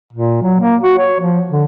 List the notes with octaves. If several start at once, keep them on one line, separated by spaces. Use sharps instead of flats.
A#2
F#3
A#3
F#4
C#5
F3
D3